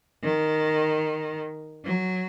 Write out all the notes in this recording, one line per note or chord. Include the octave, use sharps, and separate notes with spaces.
D#3
F#3